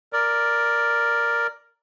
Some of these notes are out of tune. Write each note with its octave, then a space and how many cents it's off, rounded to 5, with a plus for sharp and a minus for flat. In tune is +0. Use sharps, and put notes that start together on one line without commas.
A#4 +0 D5 +0